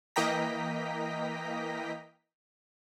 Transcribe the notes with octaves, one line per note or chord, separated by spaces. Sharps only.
E3 A#3 D#5 G5 A#5 B6